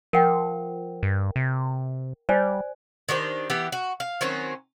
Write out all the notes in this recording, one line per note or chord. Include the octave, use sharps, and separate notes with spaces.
F3 A#4 F#5 G5
G2
C3
G3 C5 D5 G#5
D#3 D4 G4 C5
E3 B3 G4
F#4
F5
D#3 F#3 C4 C#4